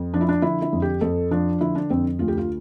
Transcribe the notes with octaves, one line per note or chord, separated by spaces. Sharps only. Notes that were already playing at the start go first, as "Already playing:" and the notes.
Already playing: F2
F3 D4
E4
D4
D3 E4
E4
F2
G4
F2 A4
F3 D4
D3 E4
D4
F2 C4
D2 F4
G4
F4